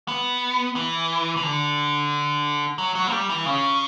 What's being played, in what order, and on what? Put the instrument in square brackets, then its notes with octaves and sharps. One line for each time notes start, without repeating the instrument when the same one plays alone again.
[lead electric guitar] B3
E3
E3
D3
F#3
F#3
A#3
G3
E3
C#3